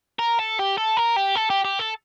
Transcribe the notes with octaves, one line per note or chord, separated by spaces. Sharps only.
A#4
A4
G4
A4
A#4
G4
A4
G4
G4
A4